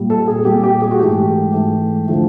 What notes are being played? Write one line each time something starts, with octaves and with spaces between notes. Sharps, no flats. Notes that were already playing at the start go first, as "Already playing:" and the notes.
Already playing: A#2 G3
A4
G#4
A#2 G3 G4
G4
G#4
F#4
G#2 E3 A3 G4
G#2 E3 A3
D3 F3 A3